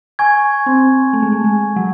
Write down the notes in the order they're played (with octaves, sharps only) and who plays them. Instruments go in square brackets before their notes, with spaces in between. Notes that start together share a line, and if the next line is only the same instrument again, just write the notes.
[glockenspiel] G#5 C#6 G#6
[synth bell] C4
A3
G#3
A3
G#3
F#3